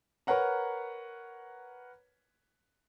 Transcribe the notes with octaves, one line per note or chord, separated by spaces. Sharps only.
A#4 B4 C#5 F#5 A#5